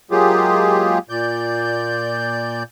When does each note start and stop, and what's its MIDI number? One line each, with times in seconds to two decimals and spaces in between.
0.11 0.98 54
0.11 0.98 56
0.11 0.98 58
0.11 0.98 65
0.11 0.98 67
0.11 0.98 68
1.09 2.63 46
1.09 2.63 74
1.09 2.63 91